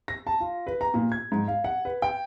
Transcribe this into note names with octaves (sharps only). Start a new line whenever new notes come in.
A#6
A5
F4
B4
A#5
A#2
G#6
G#2
F5
F#5
B4
G5